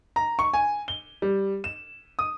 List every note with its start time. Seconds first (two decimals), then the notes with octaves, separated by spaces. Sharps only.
0.16 A#5
0.39 C#6
0.54 G#5
0.88 G7
1.22 G3
1.64 E7
2.19 D#6